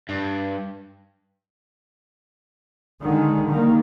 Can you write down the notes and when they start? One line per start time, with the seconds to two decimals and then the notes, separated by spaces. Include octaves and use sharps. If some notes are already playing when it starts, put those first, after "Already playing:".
0.09 G2
3.02 D3 D#3 G#3
3.48 D#3 G3 A#3